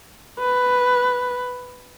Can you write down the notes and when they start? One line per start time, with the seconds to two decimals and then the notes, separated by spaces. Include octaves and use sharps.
0.40 B4